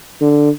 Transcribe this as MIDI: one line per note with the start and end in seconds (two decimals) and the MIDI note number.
0.21 0.50 50